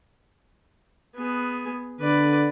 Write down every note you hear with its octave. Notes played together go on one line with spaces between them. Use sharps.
B3 G#4
D3 B4 D5